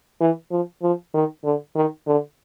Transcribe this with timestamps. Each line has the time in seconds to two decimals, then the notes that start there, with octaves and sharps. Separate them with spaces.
0.20 E3
0.51 F3
0.82 F3
1.14 D#3
1.44 D3
1.75 D#3
2.07 D3